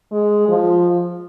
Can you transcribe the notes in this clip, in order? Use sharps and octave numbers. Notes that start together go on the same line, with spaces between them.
G#3
F3